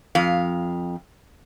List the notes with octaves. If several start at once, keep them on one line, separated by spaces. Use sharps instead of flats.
F2 F5